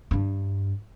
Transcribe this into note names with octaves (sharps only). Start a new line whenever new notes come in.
G2 D4